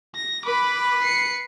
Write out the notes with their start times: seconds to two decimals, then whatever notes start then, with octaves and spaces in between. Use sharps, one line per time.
0.15 A#6
0.45 B4 B5 D6
1.01 C7 C#7